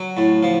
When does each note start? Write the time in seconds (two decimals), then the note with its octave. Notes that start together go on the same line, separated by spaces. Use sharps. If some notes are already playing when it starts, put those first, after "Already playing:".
Already playing: F#3
0.17 A2
0.43 F3